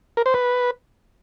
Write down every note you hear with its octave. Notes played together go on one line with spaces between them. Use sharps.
A#4
C5
B4